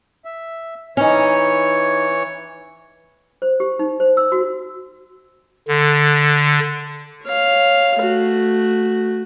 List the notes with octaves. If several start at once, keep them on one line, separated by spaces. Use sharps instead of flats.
E5
E3 C#4 D#4 C#5
C5
G4
D#4
C5
E6
F#4
D3
C#5 F5
A3 F#4